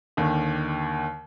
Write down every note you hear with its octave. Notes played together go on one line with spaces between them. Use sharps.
D#2 D3 D#3